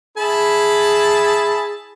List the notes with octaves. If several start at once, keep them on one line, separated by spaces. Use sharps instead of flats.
E4 G#4 A5 B5